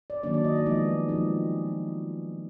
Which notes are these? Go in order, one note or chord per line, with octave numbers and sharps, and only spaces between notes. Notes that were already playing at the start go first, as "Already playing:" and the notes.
D5
D#3 F#3 A#3 D4 D5
D5
D#5
D5
F3 G#3 B3 D#4 D#5
F3 G#3 C4 D#4